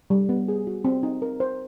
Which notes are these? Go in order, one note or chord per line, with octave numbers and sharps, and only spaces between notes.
G3
B3
G#4
F#4
C4
D#4
A#4
C5